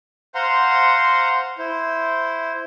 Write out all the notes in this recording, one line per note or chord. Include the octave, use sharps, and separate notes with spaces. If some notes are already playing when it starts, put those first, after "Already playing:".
C5 F5 F#5 A#5 C6
E4 C5